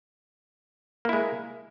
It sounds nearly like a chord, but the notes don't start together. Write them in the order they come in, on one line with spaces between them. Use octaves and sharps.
A#3 E4 G#3